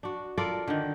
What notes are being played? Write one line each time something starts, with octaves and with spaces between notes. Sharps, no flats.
D4 F#4
F4 A4 A#4 D5
D3 D#3